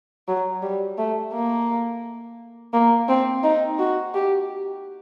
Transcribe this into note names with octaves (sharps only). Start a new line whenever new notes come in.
F#3
G3
A3
A#3
A#3
C4
D#4
F#4
G4